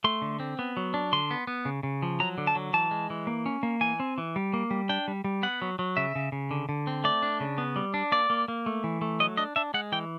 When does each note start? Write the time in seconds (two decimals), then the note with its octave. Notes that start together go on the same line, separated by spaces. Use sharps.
0.04 A3 C6
0.22 D3
0.40 C4
0.59 B3
0.77 F#3
0.94 D4
1.13 D3 C6
1.31 B3
1.47 B3
1.65 C#3
1.83 C#3
2.02 F3
2.20 F#3 A#5
2.38 D3
2.47 A5
2.55 F#3
2.73 E3 A5
2.91 G#3
3.10 E3
3.27 A#3
3.46 C#4
3.63 A#3
3.81 E3 G#5
4.00 C4
4.18 E3
4.36 G3
4.54 A#3
4.71 G3
4.89 D4 G5
5.08 G3
5.24 G3
5.43 B3 F#5
5.62 F#3
5.79 F#3
5.97 C#3 E5
6.15 C#3
6.32 C#3
6.51 D3
6.69 D3
6.87 C4
7.04 A3 D5
7.23 D4
7.40 C#3
7.58 B3
7.76 G3
7.94 D4
8.12 A#3 D5
8.30 A#3
8.48 A#3
8.66 A3
8.84 E3
9.02 A3
9.20 F#3 D#5
9.37 D4 D#5
9.56 D4 E5
9.74 G#3 F#5
9.92 E3 G5